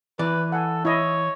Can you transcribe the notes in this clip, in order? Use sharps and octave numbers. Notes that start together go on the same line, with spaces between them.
E3 B4 D5
A4 F#5 G#5
E4 C#5 D#5